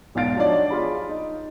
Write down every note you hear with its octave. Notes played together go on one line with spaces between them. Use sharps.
B1 E2 G#2 F5 A6 D7
F3 F#3 D4 D#4 C#5 D5
F4 G#4 B5
D#4